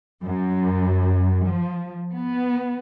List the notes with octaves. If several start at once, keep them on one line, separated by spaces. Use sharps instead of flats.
F#2
F3
B3